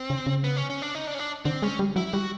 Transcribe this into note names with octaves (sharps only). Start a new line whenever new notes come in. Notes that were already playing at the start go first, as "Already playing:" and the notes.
Already playing: C4
C#3
C#3
B3
C#4
C#4
D4
D#4
D4
C#4
D4
D3 C4
G#3 C#4
G3
F#3 E4
G3 F#4